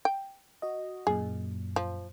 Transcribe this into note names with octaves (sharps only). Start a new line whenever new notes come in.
G5
F#4 D#5
F#2 A#2 G#4
F3